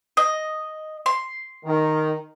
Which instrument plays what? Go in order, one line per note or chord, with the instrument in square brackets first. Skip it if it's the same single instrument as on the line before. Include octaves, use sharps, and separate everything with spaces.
[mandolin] D#5
C6
[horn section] D#3